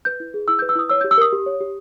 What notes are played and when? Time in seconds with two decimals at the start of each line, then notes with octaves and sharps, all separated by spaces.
0.05 B4 G6
0.20 E4
0.34 G#4
0.48 E4 E6
0.59 G6
0.62 B4
0.69 E6
0.75 E4 D#6
0.90 C#5 E6
1.01 G6
1.04 G4
1.11 E6
1.18 A#4 D#6
1.33 G4
1.46 C#5
1.61 G4